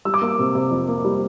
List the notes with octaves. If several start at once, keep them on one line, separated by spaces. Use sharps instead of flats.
G3 E6
D6
A#3 E6
C3
C3
F2
A#3
G3